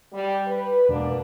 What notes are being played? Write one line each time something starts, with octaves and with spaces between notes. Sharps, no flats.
G3
B4
E1 B2 A#3 D4